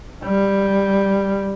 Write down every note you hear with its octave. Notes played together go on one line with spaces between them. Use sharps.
G3